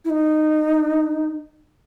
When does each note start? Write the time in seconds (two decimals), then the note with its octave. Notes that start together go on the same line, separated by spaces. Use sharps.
0.05 E4
0.10 D#4